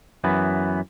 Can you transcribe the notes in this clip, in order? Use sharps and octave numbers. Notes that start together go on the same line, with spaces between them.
F#2 E3 B3